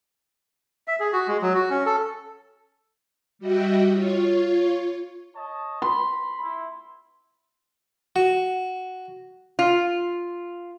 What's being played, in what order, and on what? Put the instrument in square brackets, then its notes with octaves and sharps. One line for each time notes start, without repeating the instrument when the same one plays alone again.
[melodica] E5
G#4
F#4
G#3
F#3
F#4
C#4
A4
[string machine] G3 F#4 D#5 E5 G5
F4 C#5
[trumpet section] C#5 D#5 A5
[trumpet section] B5 [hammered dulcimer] C6
[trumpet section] E4
[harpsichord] F#4
[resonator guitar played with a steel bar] F4